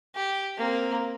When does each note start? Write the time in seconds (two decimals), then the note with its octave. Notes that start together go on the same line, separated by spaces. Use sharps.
0.15 G4
0.57 A#3 C4